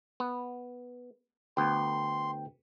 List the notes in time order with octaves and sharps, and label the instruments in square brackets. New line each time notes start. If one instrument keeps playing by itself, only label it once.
[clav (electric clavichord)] B3
[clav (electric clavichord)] D2 B3 [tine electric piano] G5 [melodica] C6